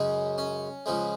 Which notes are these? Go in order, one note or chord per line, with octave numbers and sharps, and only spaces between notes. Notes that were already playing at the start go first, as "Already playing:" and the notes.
Already playing: F#2 C#3 G#3
C#4
C#2 C#3 F3 G#3